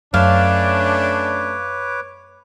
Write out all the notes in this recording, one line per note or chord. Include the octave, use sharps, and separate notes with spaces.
F#2 A3 C#4 D4 B4 C#5 F5 D6